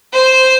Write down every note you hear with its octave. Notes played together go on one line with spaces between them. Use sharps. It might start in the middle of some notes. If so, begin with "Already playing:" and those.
C5